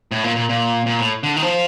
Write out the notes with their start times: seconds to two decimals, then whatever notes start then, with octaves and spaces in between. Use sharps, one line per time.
0.11 A2
0.24 A#2
0.36 A#2
0.49 A#2
0.86 A#2
0.99 A2
1.23 D3
1.36 D#3
1.42 F3